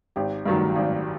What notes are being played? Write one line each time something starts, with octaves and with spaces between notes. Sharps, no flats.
G#1 G4
G2 D#3 F#3
G#1